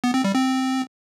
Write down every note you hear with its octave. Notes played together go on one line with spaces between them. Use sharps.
B3
C4
G3
C4